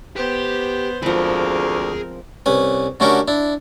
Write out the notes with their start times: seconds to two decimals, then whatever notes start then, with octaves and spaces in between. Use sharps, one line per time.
0.16 B3 G4 C5
1.02 D2 F3 G#3 C4 G#4 A#4 B5
2.46 C2 C#4 B4
3.00 D3 A3 C#4 F#4 G4 A#4
3.28 D4 E4